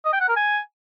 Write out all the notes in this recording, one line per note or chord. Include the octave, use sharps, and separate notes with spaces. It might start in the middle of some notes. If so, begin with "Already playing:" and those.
D#5
G5
F#5
A#4
G#5